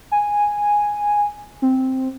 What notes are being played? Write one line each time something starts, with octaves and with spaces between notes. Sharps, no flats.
G#5
C4